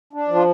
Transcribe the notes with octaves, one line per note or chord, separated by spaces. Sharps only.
D4
F3
F4